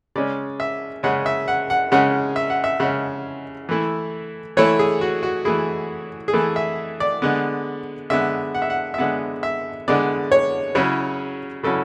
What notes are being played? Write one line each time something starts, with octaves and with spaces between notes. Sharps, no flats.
C#3 G#3 C#4 D5
E5
C#3 G#3 C#4 F#5
E5
F#5
F#5
C#3 G#3 C#4 F#5
E5
F#5
E5
C#3 G#3 C#4 F#5
E3 A3 E4
E3 A3 E4 C#5
G#4
F#4
F#4
E3 A3 E4 G#4
G#4
E3 A3 E4 A4
E5
D5
D3 G#3 B3
D3 G#3 B3 E5
F#5
E5
F#5
E5
D3 G#3 B3 F#5
E5
D3 G#3 B3 D5
C#5
C#3 F#3 C#4 E4 C#5
C#3 F#3 C#4 E4 A4